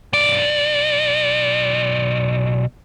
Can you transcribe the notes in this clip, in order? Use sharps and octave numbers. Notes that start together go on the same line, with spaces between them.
B1 D5